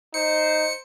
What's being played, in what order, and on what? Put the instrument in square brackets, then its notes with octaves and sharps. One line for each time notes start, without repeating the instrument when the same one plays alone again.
[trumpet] D#4 [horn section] C5 [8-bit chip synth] C#7